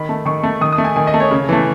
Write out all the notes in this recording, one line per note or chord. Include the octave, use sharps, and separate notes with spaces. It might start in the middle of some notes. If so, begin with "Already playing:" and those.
Already playing: D#3 B5
A3
D#3 C#6
A3
D#3 D#6
D#6
A3
G#5
D#3 G#5
D#5
A3
C#5
C#3
E3 A3